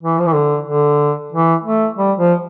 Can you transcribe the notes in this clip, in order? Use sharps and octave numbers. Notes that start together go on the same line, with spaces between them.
E3
F3
E3
D3
D3
E3
A3
G3
F3